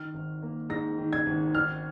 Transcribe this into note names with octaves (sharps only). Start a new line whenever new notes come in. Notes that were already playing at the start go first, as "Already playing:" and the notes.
Already playing: D#3 F6
G#1
A#3
G#2 A#6
D#3
G#6
G#1
D#3 F6